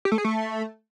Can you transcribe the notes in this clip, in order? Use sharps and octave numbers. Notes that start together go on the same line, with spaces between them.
G4
A3
G#4
A3